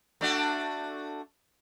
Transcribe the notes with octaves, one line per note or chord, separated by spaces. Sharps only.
A3 D4 F#4